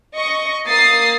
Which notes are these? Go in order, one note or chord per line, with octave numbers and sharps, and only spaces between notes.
D#5 C#6
A#3 D#6 A6 C7